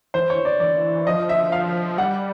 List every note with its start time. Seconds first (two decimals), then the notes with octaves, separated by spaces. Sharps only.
0.14 E3 C5
0.30 C#5
0.45 D5
0.60 E3 D5
1.07 F3 D#5
1.29 E5
1.52 F5
1.98 G3 F#5